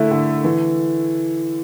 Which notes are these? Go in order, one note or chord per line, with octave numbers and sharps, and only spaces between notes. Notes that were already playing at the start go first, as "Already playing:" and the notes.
Already playing: D3 A3 E4
D3
E3